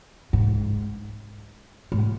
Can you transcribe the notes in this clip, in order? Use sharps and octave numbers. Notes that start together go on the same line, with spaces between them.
G#2
G#2